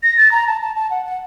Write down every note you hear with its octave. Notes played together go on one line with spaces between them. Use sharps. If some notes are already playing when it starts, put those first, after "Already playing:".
A#6
A6
A#5
A5
A5
A5
F#5
F#5